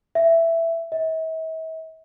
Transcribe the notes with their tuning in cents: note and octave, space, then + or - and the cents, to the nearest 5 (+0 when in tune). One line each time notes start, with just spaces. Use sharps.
E5 +10
E5 -45